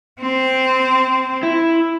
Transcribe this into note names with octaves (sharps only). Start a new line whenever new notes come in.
C4
E4